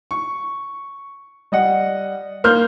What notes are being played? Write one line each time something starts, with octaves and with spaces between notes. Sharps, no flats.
C#6
G3 D#5 F#5
A#3 C6 F6 G6